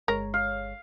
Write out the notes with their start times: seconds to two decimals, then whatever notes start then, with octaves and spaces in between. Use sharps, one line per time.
0.08 G1 G#3 A#4 C#5
0.34 F5